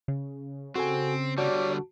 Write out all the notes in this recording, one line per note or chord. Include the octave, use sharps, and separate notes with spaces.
C#3
C4 F#4 A4 G#5
D3 G3 F#4 C#5 D5 A5